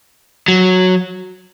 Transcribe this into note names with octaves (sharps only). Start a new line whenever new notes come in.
F#3